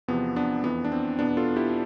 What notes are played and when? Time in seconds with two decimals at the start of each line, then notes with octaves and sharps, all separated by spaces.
0.08 E2 C3 F3 B3
0.36 B3 D4
0.64 F2 E3 B3
0.84 D4
0.92 C4
1.19 E2 B2 B3 D4
1.37 F4 A4
1.56 E4 G4